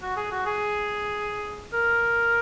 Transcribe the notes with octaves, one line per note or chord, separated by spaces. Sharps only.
F#4
G#4
F#4
G#4
A#4